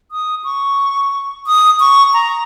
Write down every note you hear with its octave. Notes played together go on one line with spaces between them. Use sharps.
D#6
C#6
D#6
C#6
A#5